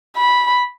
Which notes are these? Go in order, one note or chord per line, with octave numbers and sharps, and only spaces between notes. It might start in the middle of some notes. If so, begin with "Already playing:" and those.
B5